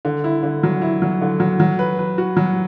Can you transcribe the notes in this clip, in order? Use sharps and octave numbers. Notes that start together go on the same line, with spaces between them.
D3
E4
D3
F#3
E4
F#3
D3
F#3
F#3
B4
B4
F#4
F#3